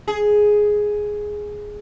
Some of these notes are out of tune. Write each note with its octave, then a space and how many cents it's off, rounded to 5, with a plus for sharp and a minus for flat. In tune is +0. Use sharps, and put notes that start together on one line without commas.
G#4 +5